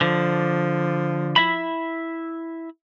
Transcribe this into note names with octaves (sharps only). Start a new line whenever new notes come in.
D3 F3
E4 E5 B5